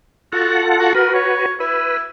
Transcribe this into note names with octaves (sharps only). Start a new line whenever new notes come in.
F4 F#4 A4 F#5
F#4
F#4 A#4 B4
C#5
E4 B4